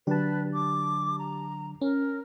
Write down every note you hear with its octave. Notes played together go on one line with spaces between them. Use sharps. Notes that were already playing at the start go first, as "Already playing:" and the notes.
D3 F#3 D4 G4 B4 A5
D6
A#5
C#4 A#4